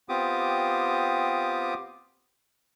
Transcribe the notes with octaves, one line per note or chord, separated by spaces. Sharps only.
B3 C4 F4 G4 D6 D#6